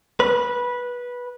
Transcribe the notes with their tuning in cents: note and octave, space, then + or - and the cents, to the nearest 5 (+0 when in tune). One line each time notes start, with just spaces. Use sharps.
B4 -15